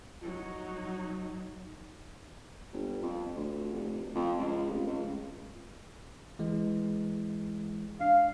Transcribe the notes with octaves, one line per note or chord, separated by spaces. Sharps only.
F#3 D#4
G1
F2
D2
F1
F2
C#2
F1
C#2
E3 G#3
D4 F5